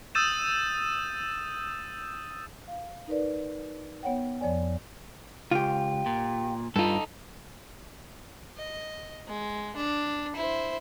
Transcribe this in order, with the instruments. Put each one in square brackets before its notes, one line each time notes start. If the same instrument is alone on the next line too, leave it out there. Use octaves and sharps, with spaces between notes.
[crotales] D#6 E6 G6 A6 D#7 E7
[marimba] F5
D#4 A#4 B4 D5
B3 C#5 F#5 G5
F2 F3 C#5 D5 G#5
[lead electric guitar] C#2 [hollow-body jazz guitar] F4 G4
[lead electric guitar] A#2
[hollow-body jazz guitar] G2 F4 [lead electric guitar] D#4 A4
[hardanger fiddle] D#5
G#3
D4
E4 C5